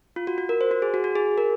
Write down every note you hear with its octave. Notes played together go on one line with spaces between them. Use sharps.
F4
F#4
F#4
A#4
C5
F#4
G#4
F#4
F#4
G#4
A#4